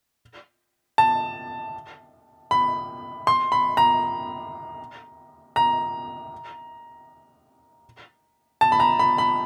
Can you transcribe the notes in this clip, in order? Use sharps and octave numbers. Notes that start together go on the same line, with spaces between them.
A5
B5
C6
B5
A#5
A#5
A5
B5
A#5
B5
B5